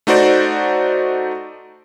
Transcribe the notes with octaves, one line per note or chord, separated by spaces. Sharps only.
A3 D#4 F#4 C5 D5